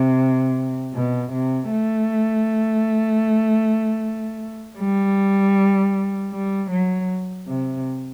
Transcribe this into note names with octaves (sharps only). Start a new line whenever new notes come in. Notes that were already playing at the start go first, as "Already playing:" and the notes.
Already playing: C3
B2
C3
A3
G3
G3
F#3
C3